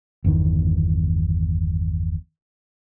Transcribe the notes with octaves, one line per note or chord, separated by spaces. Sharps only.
G1 E2 D#3